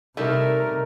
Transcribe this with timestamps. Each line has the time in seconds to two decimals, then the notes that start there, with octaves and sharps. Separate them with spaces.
0.17 C3 G3 A3 D#4 E4 A#4